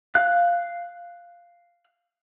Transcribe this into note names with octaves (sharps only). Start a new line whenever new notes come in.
F5 F#6